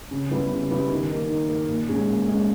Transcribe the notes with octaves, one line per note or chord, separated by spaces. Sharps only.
C#3
G3 B3 E4 G4
C#3
G3 B3 E4 G4
D#3
A#3 D#4 A#4
D#3
A#3 D#4 A#4
A#2
G#3 C#4 G#4
A#2
G#3 C#4 G#4